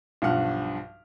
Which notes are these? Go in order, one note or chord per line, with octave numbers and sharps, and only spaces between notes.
B1 G2 F3 F#5 F6